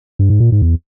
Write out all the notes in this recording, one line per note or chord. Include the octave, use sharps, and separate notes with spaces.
G2
G#2
A#2
G#2
E2